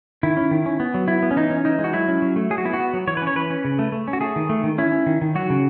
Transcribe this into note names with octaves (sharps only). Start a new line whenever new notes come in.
D#3 E4
C#4
D#3
C#4
B3
F#3
B3 E4
B3
C#4
E3 D#4
C#4
E3 D#4
G#3
F#4
F#3 E4
C#4
F#3
A3
F#3 G#4
F#4
B3 E4
F#4
B3
F#3
E3 C#5
B4
C#4
C#5
E3 B4
C#4
C#3
A3
A3
C#4
F#4
A3 G#4
D#3
A3
D#3
C#4 E4
C#4
D#3
D#3
F#3 F#4
C#3